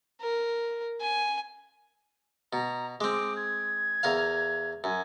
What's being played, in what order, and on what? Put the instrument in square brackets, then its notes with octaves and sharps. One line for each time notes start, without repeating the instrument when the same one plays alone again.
[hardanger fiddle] A#4
G#5
[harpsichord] B2 [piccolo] A#5
[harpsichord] G#3 C4 [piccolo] D6
[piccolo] G#6
[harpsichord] E2 A#4 F5
[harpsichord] F#2 [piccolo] G#5